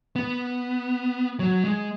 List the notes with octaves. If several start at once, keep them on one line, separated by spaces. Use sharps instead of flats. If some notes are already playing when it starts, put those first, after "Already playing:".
B3
F#3
G#3